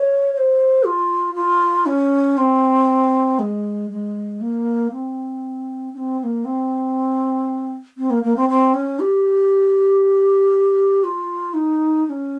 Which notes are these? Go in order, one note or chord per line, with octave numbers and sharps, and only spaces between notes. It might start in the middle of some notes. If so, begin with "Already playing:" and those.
Already playing: C#5
C#5
C5
F4
F4
C#4
C4
G#3
G#3
A#3
C4
C#4
C4
C4
A#3
C4
C4
A#3
A#3
C4
C4
C#4
G4
F4
D#4
D#4
C#4